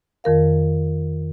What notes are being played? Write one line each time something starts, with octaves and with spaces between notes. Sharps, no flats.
F2 D#3 A#4 F5